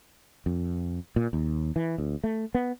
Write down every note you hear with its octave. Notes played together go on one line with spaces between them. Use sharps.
F2
A#2
D#2
E3
D2
A3
B3